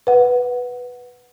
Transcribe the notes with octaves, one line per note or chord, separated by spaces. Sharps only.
B4 F#5